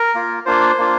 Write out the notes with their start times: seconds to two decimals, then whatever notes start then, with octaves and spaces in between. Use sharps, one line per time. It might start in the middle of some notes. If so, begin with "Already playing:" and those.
Already playing: A#4
0.14 A#3 F4
0.46 A#3 D4 F4 C5
0.78 A#3 D4 F4